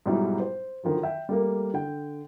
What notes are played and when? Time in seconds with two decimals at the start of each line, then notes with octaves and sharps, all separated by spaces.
0.06 G#2 B2 F#3 G3 D#4 E4
0.40 C5
0.83 D3 D#3 F3 F#3
1.03 E5 G5
1.29 G3 A3 A#3
1.74 D3 G5